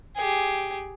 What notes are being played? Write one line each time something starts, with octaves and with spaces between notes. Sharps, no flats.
G4 G#4